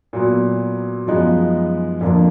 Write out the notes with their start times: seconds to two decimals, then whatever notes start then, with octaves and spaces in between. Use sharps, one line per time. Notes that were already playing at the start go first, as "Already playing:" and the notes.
0.13 A#2 F#3 B3
1.07 F#2 F3 G#3 B3 D#4
2.01 F2 D3 F3 A#3 D4